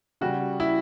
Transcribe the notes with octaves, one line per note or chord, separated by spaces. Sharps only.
C#3 G3 F#4
E4